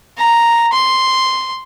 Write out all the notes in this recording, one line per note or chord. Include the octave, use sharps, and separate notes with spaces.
A#5
C6